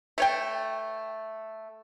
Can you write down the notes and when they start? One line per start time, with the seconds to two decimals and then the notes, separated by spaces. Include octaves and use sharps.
0.18 A3 C#5 G5